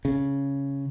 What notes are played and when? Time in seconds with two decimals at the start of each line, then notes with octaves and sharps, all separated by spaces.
0.05 C#3